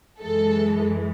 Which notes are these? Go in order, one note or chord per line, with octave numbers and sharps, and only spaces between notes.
F#2 E3 G#3 A4